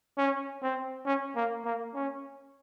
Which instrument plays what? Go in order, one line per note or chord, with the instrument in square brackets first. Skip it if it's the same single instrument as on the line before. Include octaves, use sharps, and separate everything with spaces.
[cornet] C#4
C4
C#4
A#3
A#3
C#4